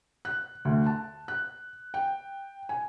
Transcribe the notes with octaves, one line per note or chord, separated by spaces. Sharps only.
F#6
D2
A5
F#6
G5
G#5